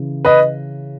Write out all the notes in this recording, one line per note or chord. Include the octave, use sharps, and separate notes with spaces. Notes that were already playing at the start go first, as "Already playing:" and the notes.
Already playing: C#3 E3
B4 D#5